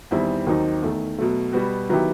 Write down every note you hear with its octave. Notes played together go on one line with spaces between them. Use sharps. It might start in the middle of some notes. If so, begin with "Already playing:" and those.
E2 D#3 G3 C4 E4
D#2 D#3 F#3 C4 D#4
E2 D#3 A3
B2 F#3 A3
B2 G3 B3 F#4
D#3 F#3 B3 E4 G4